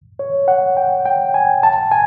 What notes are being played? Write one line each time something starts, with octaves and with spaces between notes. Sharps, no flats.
C#5
F#5
G5
G5
G#5
A5
G#5